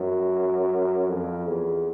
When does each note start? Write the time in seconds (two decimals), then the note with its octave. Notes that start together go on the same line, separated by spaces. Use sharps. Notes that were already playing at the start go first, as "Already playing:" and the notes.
Already playing: F#2
1.09 F2
1.48 E2